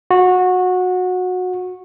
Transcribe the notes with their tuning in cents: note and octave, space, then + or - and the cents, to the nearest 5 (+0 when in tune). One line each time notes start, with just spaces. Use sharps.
F#4 -20